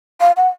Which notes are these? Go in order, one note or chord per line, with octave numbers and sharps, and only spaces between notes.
F5
F#5